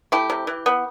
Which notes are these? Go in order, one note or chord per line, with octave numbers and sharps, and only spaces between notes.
A3 E4 G4
C3
E3
B3